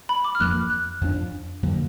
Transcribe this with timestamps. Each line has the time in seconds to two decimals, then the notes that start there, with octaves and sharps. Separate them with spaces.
0.09 B5
0.24 D6
0.35 F6
0.40 F2 F3 A#3 D4 F#6
0.70 F#6
1.01 F2 F3 A#3 D4
1.63 F2 D3 F#3 A#3